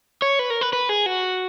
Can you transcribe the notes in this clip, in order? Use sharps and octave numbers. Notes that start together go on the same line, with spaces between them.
C#5
B4
A#4
B4
B4
G#4
F#4